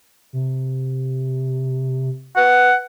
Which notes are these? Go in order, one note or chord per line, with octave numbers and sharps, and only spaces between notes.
C3
B4 F#5